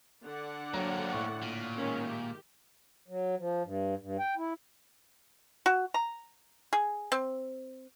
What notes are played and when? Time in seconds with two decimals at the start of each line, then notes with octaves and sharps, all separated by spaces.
0.25 D3 D5 F#5
0.74 F#3 A#3 C4
1.13 A2 C#6
1.43 A#2
1.77 D#3 G#3 C#4
2.06 G4
3.08 F#3
3.38 F3
3.64 G2
4.00 G2
4.19 G5
4.37 E4
5.66 F#4
5.94 A#5
6.73 G#4
7.12 C4